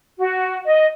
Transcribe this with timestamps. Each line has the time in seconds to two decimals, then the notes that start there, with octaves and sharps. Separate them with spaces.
0.19 F#4
0.67 D#5